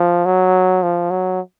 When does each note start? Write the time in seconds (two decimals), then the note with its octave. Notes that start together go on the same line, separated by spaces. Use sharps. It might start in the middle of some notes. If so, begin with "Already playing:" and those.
Already playing: F3
0.25 F#3
0.83 F3
1.10 F#3